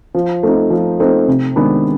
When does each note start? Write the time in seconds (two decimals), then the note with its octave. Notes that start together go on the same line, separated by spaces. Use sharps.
0.15 F3
0.43 A3 C4 D#4
0.70 F3
1.00 A3 C4 D#4
1.28 C3
1.56 D#3 G#3 B3 D4